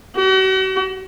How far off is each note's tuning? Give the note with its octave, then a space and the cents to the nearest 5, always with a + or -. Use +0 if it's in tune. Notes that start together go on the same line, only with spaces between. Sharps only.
F#4 +45